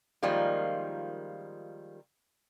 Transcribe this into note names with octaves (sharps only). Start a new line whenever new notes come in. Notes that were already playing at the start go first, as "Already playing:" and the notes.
D#3 F3 G3 G#3 A#3 F4